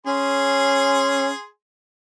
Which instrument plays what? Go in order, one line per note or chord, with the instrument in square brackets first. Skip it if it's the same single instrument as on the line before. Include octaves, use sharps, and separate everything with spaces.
[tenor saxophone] C#4 [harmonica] G#4 C6